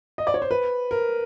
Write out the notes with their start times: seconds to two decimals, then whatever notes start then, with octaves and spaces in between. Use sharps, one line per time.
0.18 D#5
0.27 D5
0.34 C#5
0.42 C5
0.51 B4
0.91 A#4